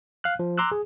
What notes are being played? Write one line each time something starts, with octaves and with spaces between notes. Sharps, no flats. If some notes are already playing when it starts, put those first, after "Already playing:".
F5 F6 F#6
F3
A#5 C6 D6 E6 F#6
G#4